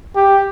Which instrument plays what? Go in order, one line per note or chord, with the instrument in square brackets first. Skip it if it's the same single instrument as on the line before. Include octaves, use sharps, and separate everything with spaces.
[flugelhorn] G4